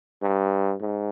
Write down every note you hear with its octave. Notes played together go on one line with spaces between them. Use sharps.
G2
G#2